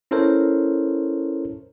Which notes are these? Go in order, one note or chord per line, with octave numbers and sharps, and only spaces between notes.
C#4 E4 A4 A#4 C5 C#5